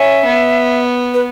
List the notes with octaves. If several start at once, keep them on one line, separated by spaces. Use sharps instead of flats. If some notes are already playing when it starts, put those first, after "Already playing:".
Already playing: C#4 E5
B3
B4